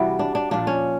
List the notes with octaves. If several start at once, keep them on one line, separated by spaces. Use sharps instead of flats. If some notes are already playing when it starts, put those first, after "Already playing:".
Already playing: C3 E3 G3 F#4
D4
D4
A#2 F3 D4
C#4